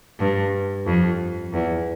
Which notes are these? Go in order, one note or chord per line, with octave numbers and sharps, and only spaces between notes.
G2
F2
E2